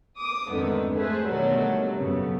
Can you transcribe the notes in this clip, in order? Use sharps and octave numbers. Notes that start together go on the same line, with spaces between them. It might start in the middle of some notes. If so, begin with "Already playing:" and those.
D6 D#6
F2 G#2 D3 D#3 A3 B3
A3 G#4 B4 C5
B2 D3 D#3 F#3 G3 A3
F#2 C#3 A3 B3